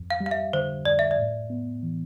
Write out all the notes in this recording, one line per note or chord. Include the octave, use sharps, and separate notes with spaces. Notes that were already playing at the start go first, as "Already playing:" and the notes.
Already playing: F2
F5
G3
F5
E5
D3 C5
F2 D5
E5
D5
A2
B3
E3